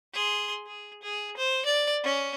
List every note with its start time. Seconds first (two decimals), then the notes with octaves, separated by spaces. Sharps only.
0.13 G#4 C6
0.66 G#4
1.02 G#4
1.36 C5
1.65 D5
2.04 C#4